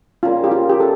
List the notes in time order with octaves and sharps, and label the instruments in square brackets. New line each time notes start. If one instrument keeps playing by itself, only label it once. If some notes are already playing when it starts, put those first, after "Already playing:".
[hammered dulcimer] C#3 G3 A#3 [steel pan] F4
[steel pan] G4
F4
G4
A4